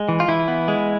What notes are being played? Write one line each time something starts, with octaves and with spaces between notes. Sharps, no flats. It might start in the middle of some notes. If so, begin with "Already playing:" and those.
Already playing: G#3
E3
F4
E3 E4
B3
G#3